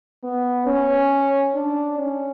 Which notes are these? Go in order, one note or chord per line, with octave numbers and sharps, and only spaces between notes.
B3
C#4
D4
C#4